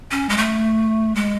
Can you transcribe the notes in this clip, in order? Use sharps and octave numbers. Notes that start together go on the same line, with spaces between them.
C#4
G#3
A3
G#3